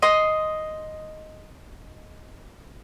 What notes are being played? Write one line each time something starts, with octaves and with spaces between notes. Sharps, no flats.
D#5 C6